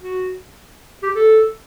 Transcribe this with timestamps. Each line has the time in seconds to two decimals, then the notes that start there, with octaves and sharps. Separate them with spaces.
0.01 F#4
1.03 G4
1.15 A4